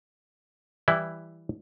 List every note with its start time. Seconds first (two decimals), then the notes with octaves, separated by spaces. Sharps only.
0.88 E3 G3 E4